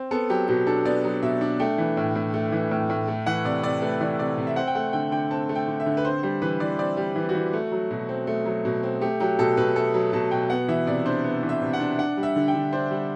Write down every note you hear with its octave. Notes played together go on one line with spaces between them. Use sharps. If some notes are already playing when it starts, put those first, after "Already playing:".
Already playing: C4
B3 A4
F#3 G4
B2 G4
D4 A4
B3 D5
F#3
B2 E5
D4
A3 G5
E3
A2
A2
A3
E3
A2
A2
A3
E3 F#5
C3 D5
C3 D5
A3 B4
E3 D5
C3 D5
C3
E5
C4 F#5
G5
A3 F#5
D3 G5
D3 G5
C4 A5
A3
G5
D3
E5
D3
B4
C4 C5
G3 C5
E3 B4
E3 D5
C4 D5
G3
E3
F#4
E3
A3
F#3
B2
C4
A3
F#3
B2
C4
A3 G4
F#3 G4
B2 A4
B2 B4
A3 A4
F#3
B2 A5
B2 G5
B3 F#5
E3 E5
C3 D5
D4 C5
B3
E3
E5
C3
F#5
D4
D4 F#5
G3
E5
D3
G5
D3
D4 C5
G3